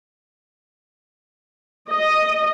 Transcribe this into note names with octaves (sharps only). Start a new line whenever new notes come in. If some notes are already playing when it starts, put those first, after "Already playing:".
D#5